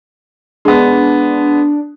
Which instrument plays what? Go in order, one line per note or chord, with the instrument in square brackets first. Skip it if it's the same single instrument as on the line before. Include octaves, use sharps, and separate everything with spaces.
[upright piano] G#3 B3 [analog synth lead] D4